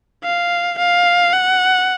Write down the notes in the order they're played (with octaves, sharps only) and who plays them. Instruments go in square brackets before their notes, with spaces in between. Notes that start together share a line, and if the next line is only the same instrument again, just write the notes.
[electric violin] F5
F5
F#5